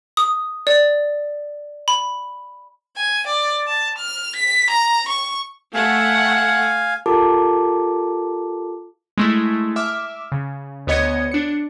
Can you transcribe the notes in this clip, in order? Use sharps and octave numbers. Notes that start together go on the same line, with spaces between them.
D#6
D5
B5
G#5
D5
A5
F6
B6
A#5
C#6
A3 F5 F#5 G#5
F4 G4 A4 A#4 A5 D6
G#3 A3 E4
E5 D6 F6
C#3
D2 B3 C#5 D#5 G#6 C#7
D4 C#7